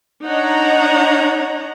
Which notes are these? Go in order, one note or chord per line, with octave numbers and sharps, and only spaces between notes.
D4 D#4 C#5 D#5 F#5 A#5